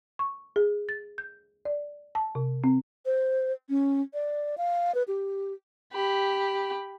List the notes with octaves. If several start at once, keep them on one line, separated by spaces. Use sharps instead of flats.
C#6
G#4
A6
G6
D5
A5
C3
C4
C5
C#4
D5
F5
B4
G4
G4 B5